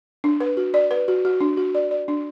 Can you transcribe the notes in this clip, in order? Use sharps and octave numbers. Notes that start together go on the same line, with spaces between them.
D4
B4
F#4
D5
B4
F#4
F#4
D4
F#4
D5
D5
D4